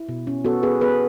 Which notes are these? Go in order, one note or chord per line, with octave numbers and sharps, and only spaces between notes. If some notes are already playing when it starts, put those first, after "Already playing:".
Already playing: E4
B2
C#4
B3 F#4 A4
B3 G#4 B4
B3 G#4 B4